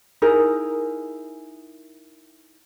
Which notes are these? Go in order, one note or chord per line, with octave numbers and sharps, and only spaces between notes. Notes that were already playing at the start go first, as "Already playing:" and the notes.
D#4 E4 G#4 A#4